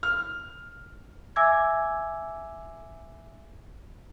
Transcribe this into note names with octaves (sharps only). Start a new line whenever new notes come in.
F6
E5 G#5 D6 E6 G#6